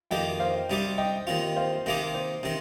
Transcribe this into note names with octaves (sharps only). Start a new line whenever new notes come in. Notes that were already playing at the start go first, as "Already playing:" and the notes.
F2 D#3 A#3 G4 D#5 G5
C5 F5
C3 G3 D#4 G4
D#5 G5
D#2 D#3 C4 F4
C5 F5
C3 D#3 A#3 D#4 G4
C5
C3 D#3 C4